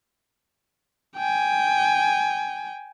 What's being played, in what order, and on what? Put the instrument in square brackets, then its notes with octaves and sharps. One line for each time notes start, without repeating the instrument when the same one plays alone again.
[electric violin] G5 G#5